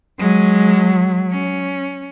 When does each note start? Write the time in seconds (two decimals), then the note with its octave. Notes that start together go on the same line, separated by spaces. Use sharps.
0.19 F#3 G#3
1.31 C#4